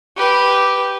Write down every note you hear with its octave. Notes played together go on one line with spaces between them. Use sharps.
G4 B4